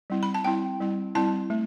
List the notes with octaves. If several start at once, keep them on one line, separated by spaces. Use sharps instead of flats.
G3 C4 E4
B5
A5
G3 C4 E4 G5
G3 C4 E4
G3 C4 E4 A5
A3